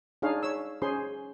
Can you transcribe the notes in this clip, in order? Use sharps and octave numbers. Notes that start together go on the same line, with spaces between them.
D4 D#4 G#4 C#5 F5
C#5 E6
C#4 G#4 C5 C6